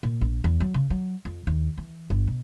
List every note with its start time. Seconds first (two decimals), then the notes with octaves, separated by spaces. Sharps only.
0.03 A#2
0.21 A#1
0.44 E2
0.60 F#3
0.74 C#3
0.90 F#3
1.25 F2
1.47 D#2
1.78 E3
2.10 G1
2.27 B2